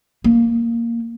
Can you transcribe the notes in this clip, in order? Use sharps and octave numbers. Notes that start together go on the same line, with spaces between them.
A#3